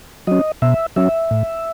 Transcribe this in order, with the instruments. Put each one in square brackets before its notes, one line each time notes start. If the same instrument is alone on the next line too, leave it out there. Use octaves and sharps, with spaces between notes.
[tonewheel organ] F#3 C#4 D#5
B2 E5
F#3 C#4 E5
A2